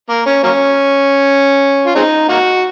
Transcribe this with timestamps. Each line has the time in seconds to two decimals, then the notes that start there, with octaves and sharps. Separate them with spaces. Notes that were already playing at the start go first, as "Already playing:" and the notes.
0.09 A#3
0.26 C#4
0.43 F#3 A#3 C#4
1.86 F4
1.95 G#3 C4 D#4
2.29 A#3 D#4 F#4